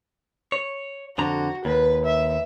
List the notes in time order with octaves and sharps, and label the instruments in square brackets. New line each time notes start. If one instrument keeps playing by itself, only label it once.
[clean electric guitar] C#5
[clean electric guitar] F2 D3 A#5 [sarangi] F#4
[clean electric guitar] D#2 [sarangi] B4
[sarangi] E5